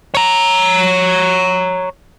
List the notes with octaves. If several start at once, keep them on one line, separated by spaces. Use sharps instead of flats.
C#5 A#5